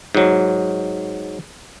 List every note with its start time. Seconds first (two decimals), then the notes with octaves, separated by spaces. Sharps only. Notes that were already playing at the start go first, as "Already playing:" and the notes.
0.15 G#2 F#3